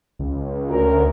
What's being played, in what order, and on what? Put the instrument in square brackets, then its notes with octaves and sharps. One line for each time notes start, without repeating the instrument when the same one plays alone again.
[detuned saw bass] C#2
[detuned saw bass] D2 [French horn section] C#4 A#4